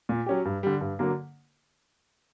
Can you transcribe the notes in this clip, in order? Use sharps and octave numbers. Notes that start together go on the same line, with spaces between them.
A#2
F#3 C#4 G4
G2
D3 G3
G2
D3 F#3 A#3